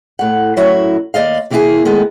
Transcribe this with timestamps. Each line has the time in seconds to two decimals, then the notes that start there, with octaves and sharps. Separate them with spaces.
0.19 A2 F#5
0.57 F#2 A2 F#3 E4 F#4 E5
1.14 D#2 D5 D#5 F5
1.50 C3 E3 A#3 B3 E4 G#4
1.85 D#3 G#3 A3 B3